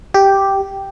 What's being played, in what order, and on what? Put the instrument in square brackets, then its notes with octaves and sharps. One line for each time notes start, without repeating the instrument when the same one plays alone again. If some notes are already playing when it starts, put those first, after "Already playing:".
[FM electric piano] G4